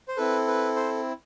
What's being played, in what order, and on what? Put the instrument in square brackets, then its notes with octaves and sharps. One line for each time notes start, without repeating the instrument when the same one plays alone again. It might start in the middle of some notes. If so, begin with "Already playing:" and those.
[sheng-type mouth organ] C5
C4 E4 A4 B4
B4
C5